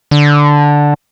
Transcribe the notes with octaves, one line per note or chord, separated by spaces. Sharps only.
D3